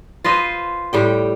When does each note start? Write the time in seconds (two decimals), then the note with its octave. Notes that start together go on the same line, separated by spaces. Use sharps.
0.24 F4 B4 C5 D#5
0.93 A2 G3 G5